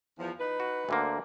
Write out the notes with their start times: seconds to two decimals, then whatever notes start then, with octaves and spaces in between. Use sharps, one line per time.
0.19 E2 F3
0.40 D#4 B4
0.60 F#4
0.89 D2 D3 A#3